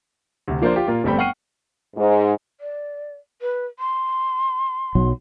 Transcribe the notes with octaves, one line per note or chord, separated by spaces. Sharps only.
D2 C3
F3 A#3 D4 F4 C5
F4 G4
A#2 A#3 F4
G1 G3 A3 C4 G5 B5
F#5 G5 C#6 F6 C7 D#7
G#2
D5
B4
C6
B1 F#3